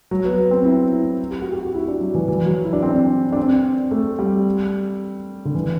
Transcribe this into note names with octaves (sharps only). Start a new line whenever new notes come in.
F#3
B3
B3
C4
E4
E4
G4
F#4
G4
F#4
E4
D4
F#3
E3
E3
F#3
E4
D4
C4
D4
D4
C4
A3
G3
D3
E3